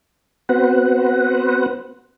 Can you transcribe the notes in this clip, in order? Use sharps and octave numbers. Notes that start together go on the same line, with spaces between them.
B3 C4 F#4 B4 C5 F#5